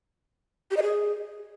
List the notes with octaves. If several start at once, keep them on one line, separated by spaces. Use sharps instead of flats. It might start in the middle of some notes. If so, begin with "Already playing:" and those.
G4
D#5
G#4